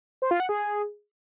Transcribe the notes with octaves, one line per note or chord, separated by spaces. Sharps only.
C5
F4
F#5
G#4